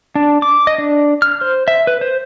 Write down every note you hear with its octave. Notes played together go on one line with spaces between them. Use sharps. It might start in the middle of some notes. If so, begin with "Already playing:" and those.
D4
D6
D#5
D4
F6
C5
E5
B4
C5